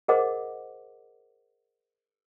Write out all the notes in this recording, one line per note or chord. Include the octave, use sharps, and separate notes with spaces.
G#4 A#4 C5 D#5 F#5 D6